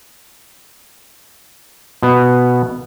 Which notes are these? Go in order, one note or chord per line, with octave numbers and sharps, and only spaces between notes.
B2 B3